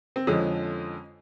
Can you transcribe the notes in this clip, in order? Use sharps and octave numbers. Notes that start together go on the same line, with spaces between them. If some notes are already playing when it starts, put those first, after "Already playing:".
C4
F2 D3 F3 G#3 C#4